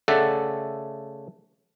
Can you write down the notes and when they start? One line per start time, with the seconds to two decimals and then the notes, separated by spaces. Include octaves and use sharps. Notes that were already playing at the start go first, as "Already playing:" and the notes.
0.08 C#3 A3 A4 D5 E5 F#5